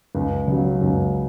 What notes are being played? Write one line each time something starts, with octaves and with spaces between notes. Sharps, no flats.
C#2
C#3 F#3
C#2